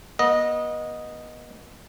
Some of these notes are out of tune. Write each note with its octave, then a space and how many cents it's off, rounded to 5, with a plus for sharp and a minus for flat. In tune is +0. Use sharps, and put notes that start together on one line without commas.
B3 -40 D#5 +0